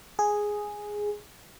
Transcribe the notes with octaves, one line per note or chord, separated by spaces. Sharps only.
G#4